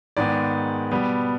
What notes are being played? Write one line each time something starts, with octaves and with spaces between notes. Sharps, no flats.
G#2 D#3 G#3 B3 D5
B2 G3 B3